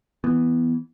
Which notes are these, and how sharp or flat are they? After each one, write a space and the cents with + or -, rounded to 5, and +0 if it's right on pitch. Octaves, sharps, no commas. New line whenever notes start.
E3 +0 B3 +0